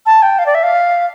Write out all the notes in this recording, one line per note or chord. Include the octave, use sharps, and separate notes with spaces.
A5
G5
F5
D5
E5
F5